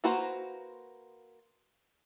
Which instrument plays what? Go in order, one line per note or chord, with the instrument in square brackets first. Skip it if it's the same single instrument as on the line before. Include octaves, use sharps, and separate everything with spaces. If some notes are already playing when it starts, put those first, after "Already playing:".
[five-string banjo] A#3 F#4 B4 C5 A#5